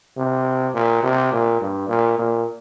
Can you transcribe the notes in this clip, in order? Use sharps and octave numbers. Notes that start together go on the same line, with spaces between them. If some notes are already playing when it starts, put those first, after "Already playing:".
C3
A#2
C3
A#2
G2
A#2
A#2